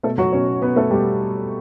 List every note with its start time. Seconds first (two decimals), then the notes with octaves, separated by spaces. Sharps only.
0.03 B2 A3 A4
0.18 F#3 F#4
0.32 B2 C#4 C#5
0.62 B2 B3 B4
0.76 A3 A4
0.91 B2 G3 G4